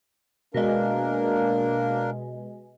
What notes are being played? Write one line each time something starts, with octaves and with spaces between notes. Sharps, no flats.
B2 G#3 A#3 D4 A#4